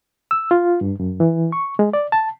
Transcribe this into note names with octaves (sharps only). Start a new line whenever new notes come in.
E6
F4
G2
F#2
E3
C#6
G#3
D5
A5